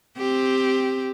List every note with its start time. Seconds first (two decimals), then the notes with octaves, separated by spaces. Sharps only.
0.17 C4 G4